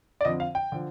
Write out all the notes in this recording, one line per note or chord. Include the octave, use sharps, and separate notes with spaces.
D5
F2 D3 F3 D#5
F5
G5
D3 F3